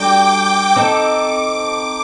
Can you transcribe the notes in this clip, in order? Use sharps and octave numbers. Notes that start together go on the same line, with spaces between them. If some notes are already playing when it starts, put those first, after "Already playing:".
Already playing: G3 D4 F#4 A4 G5 D6
C4 D#4 A4 D6